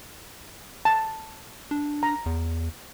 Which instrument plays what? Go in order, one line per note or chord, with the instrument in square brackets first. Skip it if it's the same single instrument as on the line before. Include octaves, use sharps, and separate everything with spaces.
[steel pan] A5
[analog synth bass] D4
[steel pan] A#5
[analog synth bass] E2